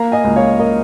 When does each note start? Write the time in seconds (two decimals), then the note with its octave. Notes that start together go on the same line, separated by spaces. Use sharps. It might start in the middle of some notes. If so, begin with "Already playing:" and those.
Already playing: A#3 F5 A#5
0.12 D#5 G#5
0.24 C#2
0.36 C#5 F5
0.59 A#4 D#5